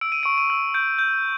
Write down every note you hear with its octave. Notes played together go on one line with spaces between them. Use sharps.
E6 D7
D#7
C#6 D7
D#7
E6
G6 D7
G6